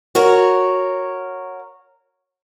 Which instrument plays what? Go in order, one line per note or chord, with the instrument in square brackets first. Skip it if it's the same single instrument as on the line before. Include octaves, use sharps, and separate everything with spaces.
[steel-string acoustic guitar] F#4 A#4 C#5